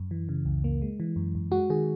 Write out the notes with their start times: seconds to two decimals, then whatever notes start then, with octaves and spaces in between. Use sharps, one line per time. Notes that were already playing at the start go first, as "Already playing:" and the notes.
Already playing: F#2
0.11 E3
0.29 C#3
0.45 C#2
0.64 A#3
0.82 G#3
1.00 E3
1.16 F#2
1.35 F#2
1.52 G#3 F#4
1.70 D#3 G#4